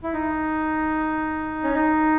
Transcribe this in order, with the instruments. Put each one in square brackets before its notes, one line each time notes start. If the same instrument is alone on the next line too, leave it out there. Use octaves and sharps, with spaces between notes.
[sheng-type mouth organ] E4
D#4
C#4
D#4